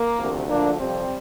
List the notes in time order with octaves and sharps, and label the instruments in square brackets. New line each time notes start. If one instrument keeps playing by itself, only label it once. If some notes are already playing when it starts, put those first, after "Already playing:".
Already playing: [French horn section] A#3
D2 C3 F3
D2 D3 F3 A#3 D4
F2 C3 F3 G3 C4